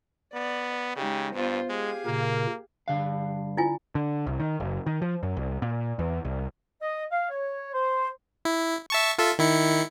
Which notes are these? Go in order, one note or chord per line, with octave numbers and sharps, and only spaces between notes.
B3 D5
C#3 G#3 D#4 G4
G2 B3 F4 C5
G#3 G4 G#4 F5
A#2 C#3 A#3 A#4
G2 D3 B3 F5 F#6
E4 F4 G#5
D3
C2
D#3
F#1
D#3
F3
F#2
C2
A#2
E2
C2
D#5
F5
C#5
C5
E4
E5 A5 C#6
F4 A4 E5
D#3 E4 C#7